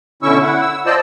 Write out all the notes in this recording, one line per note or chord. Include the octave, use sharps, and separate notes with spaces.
B2 D3 C#4 E4 C#6 E6
E4 F#5
E6
F4 C5 D5 D#5 A5 E6